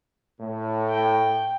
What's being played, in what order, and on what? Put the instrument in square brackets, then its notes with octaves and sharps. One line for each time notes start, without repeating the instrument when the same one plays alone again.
[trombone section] A2
[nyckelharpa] G5